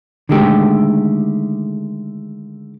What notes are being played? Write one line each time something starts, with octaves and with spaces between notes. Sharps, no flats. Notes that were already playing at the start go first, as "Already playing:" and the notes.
D3 D#3 G#3 A3 G4